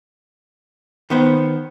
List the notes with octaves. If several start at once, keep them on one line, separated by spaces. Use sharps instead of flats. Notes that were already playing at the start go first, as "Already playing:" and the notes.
D#3 B3 C5